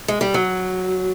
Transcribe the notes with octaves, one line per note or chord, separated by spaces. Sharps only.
G#3
G3
F#3